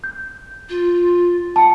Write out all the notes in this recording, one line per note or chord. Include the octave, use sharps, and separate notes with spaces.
G6
F4
F#5 A5